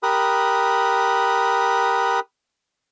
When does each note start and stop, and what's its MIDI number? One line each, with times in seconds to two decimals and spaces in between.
0.03 2.20 67
0.03 2.20 70
0.03 2.20 83
0.03 2.20 87
0.03 2.20 90